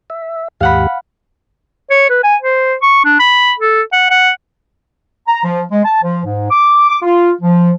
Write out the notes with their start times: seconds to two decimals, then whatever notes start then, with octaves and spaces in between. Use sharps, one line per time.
0.10 E5
0.61 D#2 G#2 G4 F5 F#5 B5
1.90 C#5
2.10 B4
2.23 G#5
2.41 C5
2.82 C#6
3.05 D4
3.19 B5
3.59 A4
3.92 F#5
4.10 F#5
5.27 A#5
5.44 F3
5.71 G#3
5.85 A5
6.02 F3
6.25 G#2
6.51 D6
6.89 D6
7.02 F4
7.42 F3